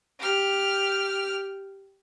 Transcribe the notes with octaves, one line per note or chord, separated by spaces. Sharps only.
G4 F6